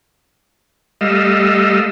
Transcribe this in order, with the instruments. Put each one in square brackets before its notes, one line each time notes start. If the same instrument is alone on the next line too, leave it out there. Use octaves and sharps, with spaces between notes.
[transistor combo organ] G3 A3 D#5 F5 E6